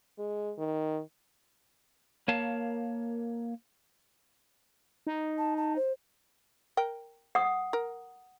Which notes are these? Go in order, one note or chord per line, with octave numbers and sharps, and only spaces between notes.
G#3
D#3
A#3 A#4 C#5 F5 A5
D#4
A5
A5
C5
A#4 G5
F#5 D#6
A#4